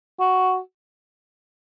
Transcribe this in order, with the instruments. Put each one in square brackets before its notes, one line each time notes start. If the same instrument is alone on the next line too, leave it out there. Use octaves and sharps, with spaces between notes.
[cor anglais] F#4